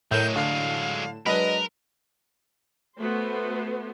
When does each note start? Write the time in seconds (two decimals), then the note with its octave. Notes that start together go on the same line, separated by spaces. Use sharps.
0.11 A2 F#3 G#3 A#4 C#5 G6 E7
0.36 D3 F5
1.26 F#3 G#3 D4 A#4 B4 D#5
2.98 A3 B3 F#4 C5